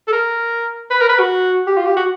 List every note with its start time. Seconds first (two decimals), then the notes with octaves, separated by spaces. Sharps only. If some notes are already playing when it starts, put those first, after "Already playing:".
0.07 A4
0.13 A#4
0.90 B4
1.00 A#4
1.09 B4
1.19 F#4
1.67 G4
1.77 F4
1.86 G4
1.97 F#4